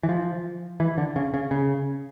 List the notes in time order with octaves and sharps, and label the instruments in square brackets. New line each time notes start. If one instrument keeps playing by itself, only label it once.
[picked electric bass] E3
F3
E3
D3
C#3
C#3
C#3